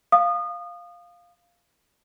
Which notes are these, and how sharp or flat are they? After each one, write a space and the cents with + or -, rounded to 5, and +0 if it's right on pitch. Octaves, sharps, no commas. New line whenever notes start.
F5 +5 D#6 -30